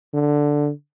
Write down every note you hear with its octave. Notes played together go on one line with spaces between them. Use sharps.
D3